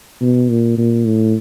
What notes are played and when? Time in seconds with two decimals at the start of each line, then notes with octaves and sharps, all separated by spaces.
0.21 B2
0.49 A#2
0.78 A#2
1.06 A2